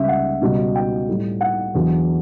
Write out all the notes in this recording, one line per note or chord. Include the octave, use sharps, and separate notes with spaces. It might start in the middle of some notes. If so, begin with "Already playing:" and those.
Already playing: C#2 C#3 G3 E5
F#5
C#2 B2 G3
G5
A2 G3
F#5
E2 D3 F#3